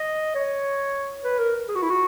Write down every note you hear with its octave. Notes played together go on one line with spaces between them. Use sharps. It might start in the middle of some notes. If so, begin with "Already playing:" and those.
Already playing: D#5
C#5
B4
A#4
G#4
F#4
E4
F#4